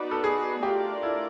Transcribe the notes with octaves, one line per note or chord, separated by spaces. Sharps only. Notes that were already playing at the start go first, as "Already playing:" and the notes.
Already playing: B3 D#4 F#4 B4 D5
A4
G#4
A3 D4 F4 G4 A#4 D5
E4